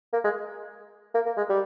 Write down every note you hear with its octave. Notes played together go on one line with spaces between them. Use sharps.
A#3
G#3
A#3
A#3
G#3
G3